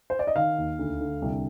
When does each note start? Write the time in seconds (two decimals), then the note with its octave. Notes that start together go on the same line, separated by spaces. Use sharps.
0.10 C5
0.19 D5
0.27 D#5
0.36 D#3 F5
0.58 D#2
0.79 D2
1.00 D3
1.22 C2